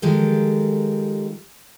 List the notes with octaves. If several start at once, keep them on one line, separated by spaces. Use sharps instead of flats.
D#3 F3 G#3 G4 A4 A#4